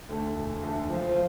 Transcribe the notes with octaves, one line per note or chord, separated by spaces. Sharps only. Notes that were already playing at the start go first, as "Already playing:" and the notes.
D2 D3 A3
E1
D2 D3 A3
C#2 F3